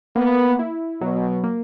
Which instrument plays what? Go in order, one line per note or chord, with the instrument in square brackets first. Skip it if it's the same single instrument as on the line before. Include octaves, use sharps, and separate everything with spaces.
[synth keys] A#3 [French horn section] B3
[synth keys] E4
[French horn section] B2 [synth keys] F#3
[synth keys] A#3